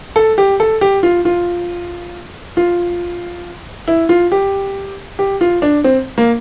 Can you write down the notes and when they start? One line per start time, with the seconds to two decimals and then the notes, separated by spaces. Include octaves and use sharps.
0.16 A4
0.38 G4
0.60 A4
0.81 G4
1.03 F4
1.25 F4
2.57 F4
3.88 E4
4.09 F4
4.32 G4
5.19 G4
5.41 F4
5.62 D4
5.84 C4
6.18 A#3